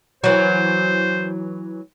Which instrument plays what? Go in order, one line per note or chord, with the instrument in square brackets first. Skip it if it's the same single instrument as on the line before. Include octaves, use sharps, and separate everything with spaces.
[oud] E3 F#3 [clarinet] C5